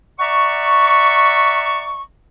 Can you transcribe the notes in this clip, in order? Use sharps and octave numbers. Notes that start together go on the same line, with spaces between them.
D5 E5 F#5 A#5 C#6